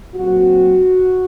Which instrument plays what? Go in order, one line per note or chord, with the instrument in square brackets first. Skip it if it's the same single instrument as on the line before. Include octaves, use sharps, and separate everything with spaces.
[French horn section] A#2 F#3 C4 F#4